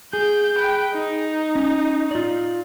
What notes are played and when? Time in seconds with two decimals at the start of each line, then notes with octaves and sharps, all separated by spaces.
0.13 G#4 G6
0.57 B4 G5
0.93 D#4
1.55 C#4
2.11 F4 D5